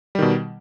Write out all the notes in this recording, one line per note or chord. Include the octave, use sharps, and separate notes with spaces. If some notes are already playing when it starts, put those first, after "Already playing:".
B2 D#3 G3